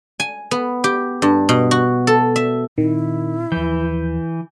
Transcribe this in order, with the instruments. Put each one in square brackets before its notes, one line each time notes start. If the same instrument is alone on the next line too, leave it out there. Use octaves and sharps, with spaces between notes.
[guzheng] G#5
B3
G4
G2
B2
F#4
A4
E5
[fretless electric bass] A#2 C4 [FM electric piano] D#3 [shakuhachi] E4
[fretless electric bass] D#2 F3 [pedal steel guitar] E3 [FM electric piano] G6